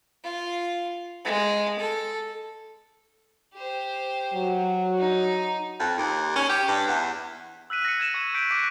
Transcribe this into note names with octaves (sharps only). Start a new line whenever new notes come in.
F4
G#3
A4
G4 C5
F#3
D#4
F2
D#2
C#4
G4
G2
E2
E6 F#6 B6 D#7
A#6 C#7
G#6 A#6 E7
C#6 G#6
G6 B6 D7
D6 F#6 B6 D#7